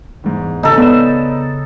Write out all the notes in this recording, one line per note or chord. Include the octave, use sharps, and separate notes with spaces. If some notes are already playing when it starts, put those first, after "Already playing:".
E2 G#2
C#3 D#4 A4
B3 B4 D5 D#5 E7